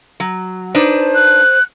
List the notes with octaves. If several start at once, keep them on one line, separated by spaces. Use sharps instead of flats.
F#3
D4 D#4 B4 C5
F#6